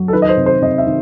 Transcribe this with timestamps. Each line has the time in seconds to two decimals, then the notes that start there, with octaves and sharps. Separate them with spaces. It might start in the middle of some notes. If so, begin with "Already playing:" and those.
Already playing: F#3
0.08 A4
0.13 D#3 B4
0.22 D#5
0.29 C5
0.37 C3
0.46 C5
0.62 C3 D#5
0.78 E5
0.87 D#3